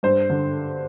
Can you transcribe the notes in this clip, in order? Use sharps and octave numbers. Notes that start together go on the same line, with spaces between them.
G2 C5
D3